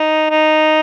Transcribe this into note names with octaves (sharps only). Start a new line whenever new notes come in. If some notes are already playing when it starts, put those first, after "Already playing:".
Already playing: D#4
D#4